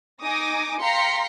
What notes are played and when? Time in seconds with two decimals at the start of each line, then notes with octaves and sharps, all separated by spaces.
0.22 D#4 G#5 D6 D#6 A#6
0.81 F5 G5 A#5 C6 B6 C#7